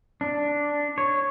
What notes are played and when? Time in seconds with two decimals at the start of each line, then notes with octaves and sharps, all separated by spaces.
0.21 D4
0.98 C#5